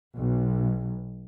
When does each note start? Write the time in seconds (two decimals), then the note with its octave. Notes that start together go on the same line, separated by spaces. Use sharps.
0.17 B1